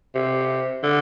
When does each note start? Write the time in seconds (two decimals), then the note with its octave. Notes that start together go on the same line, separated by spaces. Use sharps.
0.15 C3
0.83 D3